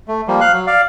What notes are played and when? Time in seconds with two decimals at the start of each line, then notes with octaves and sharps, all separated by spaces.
0.08 A3
0.28 F3 G3 A#3
0.41 F5 F#6
0.53 F#3
0.67 D5 F5